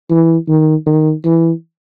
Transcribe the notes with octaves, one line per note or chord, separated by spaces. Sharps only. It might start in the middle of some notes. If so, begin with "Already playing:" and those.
E3
D#3
D#3
E3